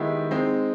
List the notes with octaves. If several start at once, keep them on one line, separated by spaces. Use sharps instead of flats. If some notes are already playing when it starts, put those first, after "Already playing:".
Already playing: D#3 G#3 B3 E4 G4
G#3 C4 D#4